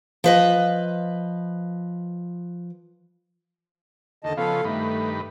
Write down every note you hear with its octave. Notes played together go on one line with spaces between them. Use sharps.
F3 B4 D#5
D#2 D3 D#5 A5
C#3 F3 B3 A4 F5
G2 D#3 A3 B4